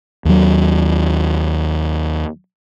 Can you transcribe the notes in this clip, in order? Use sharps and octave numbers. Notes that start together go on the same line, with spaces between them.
D#2 F#3